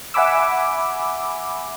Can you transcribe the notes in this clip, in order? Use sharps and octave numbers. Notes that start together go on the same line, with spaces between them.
E5 F#5 G#5 B5 D6 E6